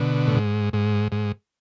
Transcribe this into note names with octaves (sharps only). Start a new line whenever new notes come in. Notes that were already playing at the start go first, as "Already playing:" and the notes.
Already playing: B2 D3
A2
G#2
G#2
G#2